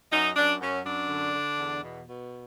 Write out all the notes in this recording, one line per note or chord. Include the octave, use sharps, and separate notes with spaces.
F#2 D#4
F#2 D4
F#2 C#4
F#2 D4
D3
D3
E2
B2
B2